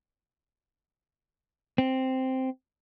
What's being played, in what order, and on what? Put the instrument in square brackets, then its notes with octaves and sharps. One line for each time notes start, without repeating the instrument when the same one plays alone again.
[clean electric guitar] C4